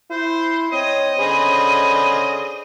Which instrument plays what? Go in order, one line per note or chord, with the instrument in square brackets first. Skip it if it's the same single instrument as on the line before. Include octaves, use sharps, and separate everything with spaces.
[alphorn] E4 [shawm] C5
[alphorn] C4 [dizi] C#5 [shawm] D#5
[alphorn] D3 [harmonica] C#4 G#4 C5 [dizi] B5